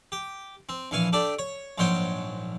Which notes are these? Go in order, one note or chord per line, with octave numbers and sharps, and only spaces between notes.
G4
C4
A#1 E3 F5 G#5 C#6
A3 D4 G4 D5
C#5
A#1 G#2 F#3 C5 C#5 G5